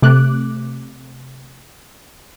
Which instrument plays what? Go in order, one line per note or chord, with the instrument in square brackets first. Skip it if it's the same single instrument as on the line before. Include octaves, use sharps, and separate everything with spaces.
[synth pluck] C3 A3 D6 F#6